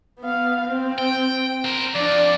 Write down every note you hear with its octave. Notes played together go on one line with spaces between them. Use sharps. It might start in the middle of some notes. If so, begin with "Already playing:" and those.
B3 F5
C4
G5
A#4 C5
F2 D4 D5